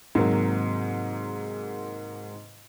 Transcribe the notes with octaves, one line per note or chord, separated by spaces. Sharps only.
G#2 C3 D#3 F#3 A#3